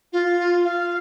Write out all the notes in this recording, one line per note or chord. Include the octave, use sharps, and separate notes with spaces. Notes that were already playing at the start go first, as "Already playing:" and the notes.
F4
F5